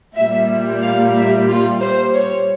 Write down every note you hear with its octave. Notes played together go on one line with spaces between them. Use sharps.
A#2 G3 E5
F5
E5
F4
C5
C#5